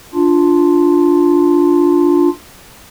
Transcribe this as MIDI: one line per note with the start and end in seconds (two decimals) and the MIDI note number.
0.14 2.29 62
0.14 2.29 65